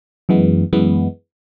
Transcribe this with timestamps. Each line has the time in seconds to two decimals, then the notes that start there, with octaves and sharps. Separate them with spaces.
0.29 F#2 E3 G#3 B3
0.73 F#2 E3 G#3 B3